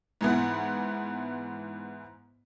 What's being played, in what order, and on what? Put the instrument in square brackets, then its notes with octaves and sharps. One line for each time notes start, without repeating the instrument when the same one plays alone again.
[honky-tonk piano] G#2 E3 B3